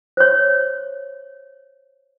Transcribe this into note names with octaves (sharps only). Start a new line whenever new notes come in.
C5 C#5